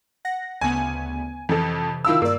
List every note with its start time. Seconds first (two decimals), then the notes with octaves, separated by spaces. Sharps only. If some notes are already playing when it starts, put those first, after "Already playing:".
0.25 F#5 A#6
0.61 D2 C#3 B3 G#5
1.49 F2 C3 E3 A4
2.05 D#3 E4 F4 F5 A5 E6
2.22 G2 A#3 D5